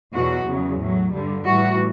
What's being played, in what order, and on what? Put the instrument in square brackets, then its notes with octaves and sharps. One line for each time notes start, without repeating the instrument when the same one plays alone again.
[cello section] E2 B2 F#3 F#4
E2 C#3 F#3
A2 F#3
G2 D3 G3
A2 E3 G3 F#4